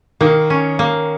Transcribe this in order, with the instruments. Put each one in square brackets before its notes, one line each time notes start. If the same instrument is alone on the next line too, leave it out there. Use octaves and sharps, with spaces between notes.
[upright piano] D#3 [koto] A#3
[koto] C#4
A#3